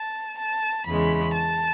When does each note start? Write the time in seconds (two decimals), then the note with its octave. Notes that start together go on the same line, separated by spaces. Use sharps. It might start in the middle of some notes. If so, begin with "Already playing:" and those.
Already playing: A5
0.38 A5
0.87 E2 C#3 G#3 B5
1.35 A5